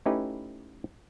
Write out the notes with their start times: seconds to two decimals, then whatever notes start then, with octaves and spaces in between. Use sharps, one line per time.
0.06 A3 C#4 D#4 E4 G4 B4